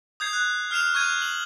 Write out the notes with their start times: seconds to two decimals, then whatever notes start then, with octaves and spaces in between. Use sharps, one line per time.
0.20 D#6 G6 G#6 C7
0.33 F#6
0.71 F6 C7 E7 F7
0.94 C#6 F6 G6 G#6 D#7
1.22 F#7